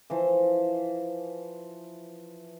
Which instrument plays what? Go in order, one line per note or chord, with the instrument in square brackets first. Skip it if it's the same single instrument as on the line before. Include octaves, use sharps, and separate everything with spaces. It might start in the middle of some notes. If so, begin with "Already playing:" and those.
[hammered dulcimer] E3 F3 C5